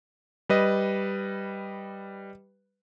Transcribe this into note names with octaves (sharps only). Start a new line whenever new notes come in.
G3 B4 D#5